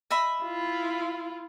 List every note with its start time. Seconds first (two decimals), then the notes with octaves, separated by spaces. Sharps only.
0.10 D#5 E5 B5
0.43 E4 F4